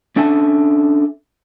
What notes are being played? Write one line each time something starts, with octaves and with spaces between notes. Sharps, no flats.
C#4 D4 A4 E5 G#5 A5